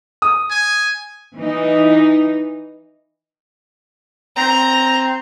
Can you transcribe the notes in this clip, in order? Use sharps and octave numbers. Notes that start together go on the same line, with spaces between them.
D#6
G#5
E3 D#4
C4 A#5